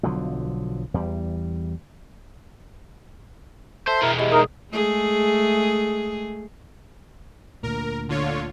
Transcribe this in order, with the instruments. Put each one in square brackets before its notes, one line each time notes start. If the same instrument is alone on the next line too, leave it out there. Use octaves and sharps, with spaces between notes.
[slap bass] B1 D3 F3 F#3
E2 G3
[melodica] A4 E5 [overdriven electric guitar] C5
[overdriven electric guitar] B2 G#3 [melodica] E4 A#4
[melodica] E4 [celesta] G4 G#4 D#5
[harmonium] D#4 A#4 [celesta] G#4 D#6
[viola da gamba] G#3 A3 G#4
[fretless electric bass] D2 A#2 [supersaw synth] A#4
[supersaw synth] D3 F4 C#5